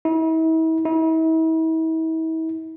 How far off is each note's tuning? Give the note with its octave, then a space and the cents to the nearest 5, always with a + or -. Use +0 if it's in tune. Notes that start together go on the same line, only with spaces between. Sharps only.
E4 -40
E4 -40